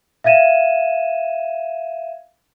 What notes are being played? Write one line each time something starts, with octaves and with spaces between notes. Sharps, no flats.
E5 F5 G#6 D#7 E7